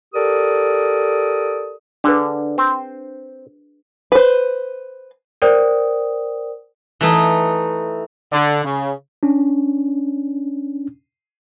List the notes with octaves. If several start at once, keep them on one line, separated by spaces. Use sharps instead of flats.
G4 A4 A#4 D5 D#6
D3 D4 G#4 B4
C4 C5
B4 C5
A#4 C5 D5 G5 D#6
E3 A3 D#4
D3
C#3
C#4 D4